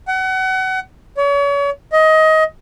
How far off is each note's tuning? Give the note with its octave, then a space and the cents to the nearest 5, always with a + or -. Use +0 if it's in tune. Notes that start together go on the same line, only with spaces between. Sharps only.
F#5 +30
C#5 +35
D#5 +20